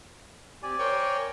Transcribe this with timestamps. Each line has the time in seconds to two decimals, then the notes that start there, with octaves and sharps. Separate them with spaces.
0.63 C4 G4 D5 G#5
0.79 A#4 C5 C#5 G5